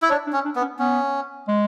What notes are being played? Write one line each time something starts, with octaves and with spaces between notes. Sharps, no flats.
E4
D4 C#5
D4
C#4
D4
B3
C#4
B3 C#4
G#3